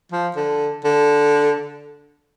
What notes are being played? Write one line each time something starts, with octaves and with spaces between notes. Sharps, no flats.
F3
D3
D3